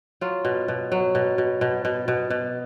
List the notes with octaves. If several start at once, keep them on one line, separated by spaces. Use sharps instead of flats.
F#3 F4
B2
B2
F#3
B2
B2
B2
B2
B2
B2